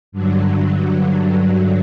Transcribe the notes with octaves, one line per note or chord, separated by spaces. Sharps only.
G2 D3 F#3